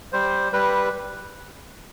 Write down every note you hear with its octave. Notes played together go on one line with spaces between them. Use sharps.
G3 C5
G3 B4